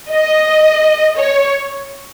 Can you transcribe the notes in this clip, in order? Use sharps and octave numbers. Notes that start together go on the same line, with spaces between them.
D#5
C#5